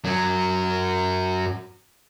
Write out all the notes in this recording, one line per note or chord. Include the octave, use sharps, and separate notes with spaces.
F#2 F#3